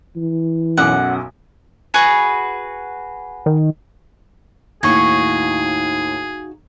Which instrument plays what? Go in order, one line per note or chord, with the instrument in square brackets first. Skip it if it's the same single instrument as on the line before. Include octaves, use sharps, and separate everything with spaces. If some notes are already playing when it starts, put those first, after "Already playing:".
[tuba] E3
[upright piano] B1 F#2 D6 [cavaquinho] F#5
[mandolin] F#4 G#4 B4
[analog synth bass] D#3
[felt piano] D#2 A2 [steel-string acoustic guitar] D#4 F#4 F5 [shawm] G#4 [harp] C#6 G#6